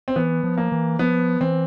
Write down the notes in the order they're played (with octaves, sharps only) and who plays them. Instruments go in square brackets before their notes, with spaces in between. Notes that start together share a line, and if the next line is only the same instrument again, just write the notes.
[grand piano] C4
[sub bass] E3 [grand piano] B3
[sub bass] F3
[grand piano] A#3
[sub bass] E3
[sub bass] F3 [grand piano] B3
[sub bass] E3 [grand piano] C4